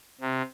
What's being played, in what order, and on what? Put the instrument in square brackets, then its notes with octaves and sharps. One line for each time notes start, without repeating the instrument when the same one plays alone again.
[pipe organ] C3